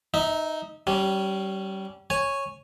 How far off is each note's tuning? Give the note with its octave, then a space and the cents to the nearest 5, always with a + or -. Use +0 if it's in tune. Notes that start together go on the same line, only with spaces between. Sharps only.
D#4 +0 E5 -25
G3 -25 C#4 +0
C#5 -5 G#5 +0